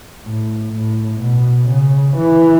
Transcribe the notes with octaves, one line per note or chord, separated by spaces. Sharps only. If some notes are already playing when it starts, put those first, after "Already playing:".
A2
A2
B2
C#3
E3